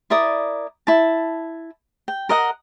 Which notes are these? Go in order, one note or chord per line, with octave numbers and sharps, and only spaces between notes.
E4 A#4 D5 D#6
E4 A5
G5
A#4 D#5 F#5